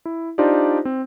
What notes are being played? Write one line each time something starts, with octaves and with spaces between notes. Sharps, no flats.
E4
D4 D#4 F4 G4 C5 D5
C4